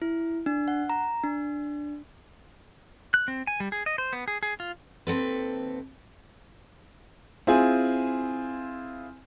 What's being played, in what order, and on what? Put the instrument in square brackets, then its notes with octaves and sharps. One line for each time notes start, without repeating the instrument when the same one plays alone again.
[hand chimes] E4
D4
F#5
A#5
D4
[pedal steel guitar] F#6
C4
G#5
G3
G#4
D#5
C5
B3
G#4
G#4
F4
[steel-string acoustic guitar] D#2 C4 A4 B4
[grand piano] C4 E4 F4 G#4 G#5